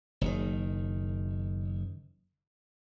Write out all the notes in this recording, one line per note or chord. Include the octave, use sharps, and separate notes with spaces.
F#1 D#3